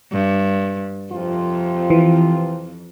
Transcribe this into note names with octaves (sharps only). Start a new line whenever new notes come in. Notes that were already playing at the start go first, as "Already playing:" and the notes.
G2
F2 C3 F3 F4
E3